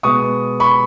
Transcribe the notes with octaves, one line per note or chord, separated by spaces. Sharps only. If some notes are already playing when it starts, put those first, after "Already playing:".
B2 G#3 B3 C#6 D#6
B5 C#6